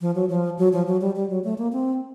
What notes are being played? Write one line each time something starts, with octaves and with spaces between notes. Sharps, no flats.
F3
F#3
F3
F#3
F3
F#3
G3
G3
F#3
A3
A#3
C4